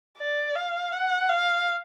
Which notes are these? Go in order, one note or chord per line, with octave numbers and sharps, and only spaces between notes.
D5
F5
F#5
F5